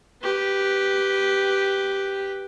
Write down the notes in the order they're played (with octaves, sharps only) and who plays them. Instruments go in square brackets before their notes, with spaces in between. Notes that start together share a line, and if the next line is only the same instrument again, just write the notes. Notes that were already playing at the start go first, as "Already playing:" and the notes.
[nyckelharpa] G4 B4